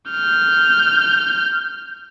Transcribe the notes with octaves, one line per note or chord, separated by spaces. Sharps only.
F6 G6